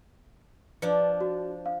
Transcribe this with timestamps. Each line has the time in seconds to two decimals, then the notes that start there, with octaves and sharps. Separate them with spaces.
0.82 F3 D4 B4 D5
1.21 F#4
1.66 F5